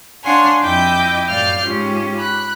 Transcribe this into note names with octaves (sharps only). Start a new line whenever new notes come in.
D4 C#5 F5 F#5 G#5 C6
F2 E4 D#5 G5 D6 G6
F#2 A2 D5 F5 F6 G6
G#2 C#4 F4 G4
B5 F#6